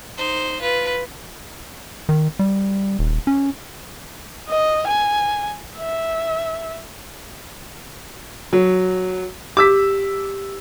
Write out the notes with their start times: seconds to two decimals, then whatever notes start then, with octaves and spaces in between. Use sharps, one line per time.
0.17 D#4 C5
0.62 F4 B4
2.09 D#3
2.39 G3
2.99 D#1
3.27 C#4
4.48 D#5
4.87 G#5
5.79 E5
8.53 F#3
9.57 G4 D6 E6 B6